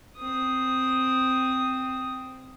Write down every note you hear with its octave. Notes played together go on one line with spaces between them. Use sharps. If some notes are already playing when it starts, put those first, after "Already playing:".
C4 D#6